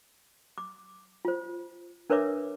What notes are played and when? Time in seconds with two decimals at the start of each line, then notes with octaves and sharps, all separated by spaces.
0.58 D6
1.25 F4 C5
2.10 D4 A#4 B4 C#5 E5 D6